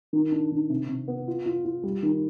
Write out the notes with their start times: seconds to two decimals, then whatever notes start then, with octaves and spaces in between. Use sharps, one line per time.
0.13 D#3
0.32 D4
0.52 D#3
0.70 C3
0.89 C3
1.08 B3
1.28 F4
1.46 F4
1.65 F4
1.83 G3
2.03 D#3